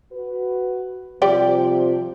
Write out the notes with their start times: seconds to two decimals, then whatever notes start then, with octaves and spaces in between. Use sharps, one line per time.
0.12 F#4 B4
1.22 C3 F3 G3 G4 D5